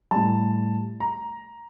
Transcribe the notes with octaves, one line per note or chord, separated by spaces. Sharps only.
A2 G3 A5
A#5